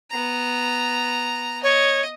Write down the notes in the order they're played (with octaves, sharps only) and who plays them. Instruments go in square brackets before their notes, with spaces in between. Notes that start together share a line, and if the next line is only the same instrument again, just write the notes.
[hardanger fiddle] B3 A#5
[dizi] C#5 [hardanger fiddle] D#5